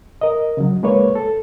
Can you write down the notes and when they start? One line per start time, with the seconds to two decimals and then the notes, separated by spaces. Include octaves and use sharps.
0.21 A#4 D#5
0.57 C#3 F#3
0.83 G#3 A#3 B4 C#5
1.15 A4